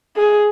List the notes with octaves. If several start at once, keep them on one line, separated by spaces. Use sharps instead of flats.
G#4